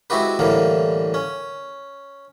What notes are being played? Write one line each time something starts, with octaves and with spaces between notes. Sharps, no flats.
G#3 C4 E4 F#4 G4 B4
A2 D3 E3 G3 A#3
C#4